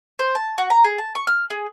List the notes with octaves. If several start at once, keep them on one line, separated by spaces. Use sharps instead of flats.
C5
A5
F#4
A#5
G#4
A5
C#6
F6
G#4